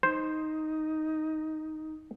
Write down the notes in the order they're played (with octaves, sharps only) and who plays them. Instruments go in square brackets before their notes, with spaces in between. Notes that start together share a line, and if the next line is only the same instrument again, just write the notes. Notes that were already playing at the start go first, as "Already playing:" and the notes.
[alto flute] D#4 [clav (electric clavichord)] C5